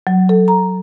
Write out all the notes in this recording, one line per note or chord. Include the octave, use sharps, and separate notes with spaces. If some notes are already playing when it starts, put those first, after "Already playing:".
F#3
A4
A#5